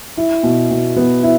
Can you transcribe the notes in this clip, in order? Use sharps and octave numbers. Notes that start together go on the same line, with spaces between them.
E4
B2
B2
B3
E4